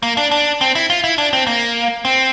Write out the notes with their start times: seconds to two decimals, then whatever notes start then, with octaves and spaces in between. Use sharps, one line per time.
0.03 A#3
0.17 D4
0.31 D4
0.61 C4
0.75 E4
0.90 F4
1.04 E4
1.18 D4
1.33 C4
1.47 A#3
2.05 C4